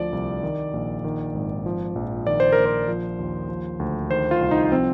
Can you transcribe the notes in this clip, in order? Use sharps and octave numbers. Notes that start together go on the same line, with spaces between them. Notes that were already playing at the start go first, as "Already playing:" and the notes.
Already playing: D2 F3 D5
C2
D#3
A#1
D#3
G#1
F3
A#1
D#3 D5
C5
A#4
A#1
C5
F3
D#2
F3
D2
D#3 C5
F4
C2
D#4
F3 C4